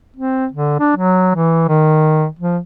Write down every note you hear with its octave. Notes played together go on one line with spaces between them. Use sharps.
C4
D3
D4
F#3
E3
D#3
F3